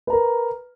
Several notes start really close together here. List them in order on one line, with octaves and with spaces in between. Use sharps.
B4 A#5 A#4